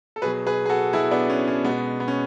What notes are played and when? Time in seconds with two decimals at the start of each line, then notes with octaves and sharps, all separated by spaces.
0.16 A4
0.22 B2 G#4 B4
0.26 F#3
0.47 G#4 B4
0.66 G#4
0.69 F#4 A4
0.93 B2 F#3 E4 G#4
1.11 B3 D4
1.30 C#4
1.48 C#4
1.64 B2 G#3 B3
2.00 B3
2.08 C#4